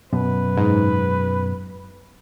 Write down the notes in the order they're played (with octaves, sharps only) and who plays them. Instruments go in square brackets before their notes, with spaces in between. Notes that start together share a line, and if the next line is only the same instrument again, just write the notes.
[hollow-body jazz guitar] F#2 B2 [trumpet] B4
[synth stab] G#2